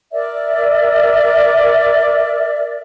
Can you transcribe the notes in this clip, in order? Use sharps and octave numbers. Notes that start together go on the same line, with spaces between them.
A#4 D5 E5